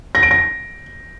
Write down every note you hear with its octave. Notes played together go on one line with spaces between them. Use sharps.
A#6
D7
A#6